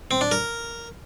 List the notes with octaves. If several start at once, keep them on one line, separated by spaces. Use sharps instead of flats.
C4
D4
A#4